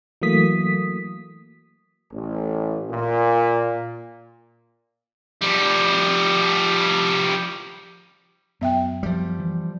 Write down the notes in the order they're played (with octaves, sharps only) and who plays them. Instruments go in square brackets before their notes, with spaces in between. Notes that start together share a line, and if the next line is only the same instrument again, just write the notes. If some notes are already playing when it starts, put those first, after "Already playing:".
[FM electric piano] E3 F#3 A3 A#3 D#6 B6
[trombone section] A1
A#2
[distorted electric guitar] F3 G3
[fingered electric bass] F#2 [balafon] B3 E5 G5
[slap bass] F3 G3
[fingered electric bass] E3